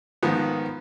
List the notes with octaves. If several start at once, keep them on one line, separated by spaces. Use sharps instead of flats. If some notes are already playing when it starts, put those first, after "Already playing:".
G#2 D#3 F3 B3